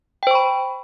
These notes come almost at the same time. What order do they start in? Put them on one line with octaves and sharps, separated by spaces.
G5 C5 C#6 B5